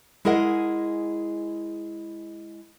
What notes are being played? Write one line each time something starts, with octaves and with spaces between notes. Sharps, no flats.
G#3 E4 G#4 A#4 D#5 F#5